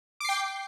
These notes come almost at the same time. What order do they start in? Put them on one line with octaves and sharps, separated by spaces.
D6 C7 G5